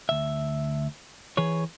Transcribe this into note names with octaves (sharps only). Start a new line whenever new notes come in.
D2 E5
E3 G#4 B4 C#5